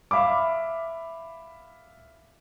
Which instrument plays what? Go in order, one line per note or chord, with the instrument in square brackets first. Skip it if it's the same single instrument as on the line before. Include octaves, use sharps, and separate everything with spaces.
[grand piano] E5 F5 B5 D6